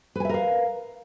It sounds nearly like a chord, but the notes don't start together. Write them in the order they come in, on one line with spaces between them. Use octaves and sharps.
B4 G#5 E5 A#4 F5